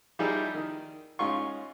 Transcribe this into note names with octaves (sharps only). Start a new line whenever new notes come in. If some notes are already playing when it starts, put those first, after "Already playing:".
F3 G3 D#4 E4 G4 G#4
D#3
G#2 C#4 F4 C6 C#6